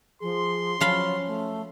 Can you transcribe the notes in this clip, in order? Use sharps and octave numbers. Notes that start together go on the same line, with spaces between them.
F3 G#4 C6
F3 F#3 C#4 F5 B5
A3